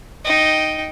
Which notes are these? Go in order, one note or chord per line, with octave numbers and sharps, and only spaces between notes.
D#4 G5